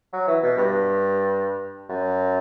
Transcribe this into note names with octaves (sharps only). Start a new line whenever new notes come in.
F#3
E3
B2
G2
F#2